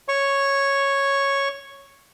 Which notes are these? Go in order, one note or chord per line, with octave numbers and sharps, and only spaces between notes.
C#5 C#6